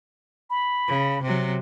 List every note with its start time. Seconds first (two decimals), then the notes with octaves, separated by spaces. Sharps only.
0.50 B5
0.88 C#3
1.23 C3 F#3